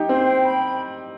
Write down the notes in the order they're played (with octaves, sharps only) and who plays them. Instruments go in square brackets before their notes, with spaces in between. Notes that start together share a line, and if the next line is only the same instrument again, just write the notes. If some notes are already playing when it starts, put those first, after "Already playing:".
Already playing: [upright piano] D#4 G4
[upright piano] C4 [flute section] C5
[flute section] G5
B5